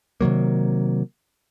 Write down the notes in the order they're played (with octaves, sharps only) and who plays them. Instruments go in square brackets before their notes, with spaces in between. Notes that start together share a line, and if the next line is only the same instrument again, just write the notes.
[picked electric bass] C3 D#3 F#3 A#3